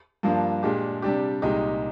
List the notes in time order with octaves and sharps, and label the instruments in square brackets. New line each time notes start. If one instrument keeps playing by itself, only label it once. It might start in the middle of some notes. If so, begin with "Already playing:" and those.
[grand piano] G2 F3 A#3 D4
A#2 G#3 D4 G4
C3 G3 D4 G4
C2 A#2 G#3 D#4 G4